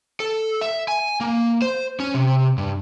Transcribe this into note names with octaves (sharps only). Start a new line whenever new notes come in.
A4
E5
G#5
A#3
C5
C#4
C3
G2